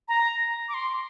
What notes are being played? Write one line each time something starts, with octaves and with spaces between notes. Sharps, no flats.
A#5
D6
C6